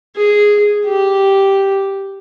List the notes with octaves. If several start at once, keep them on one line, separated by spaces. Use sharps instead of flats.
G#4
G4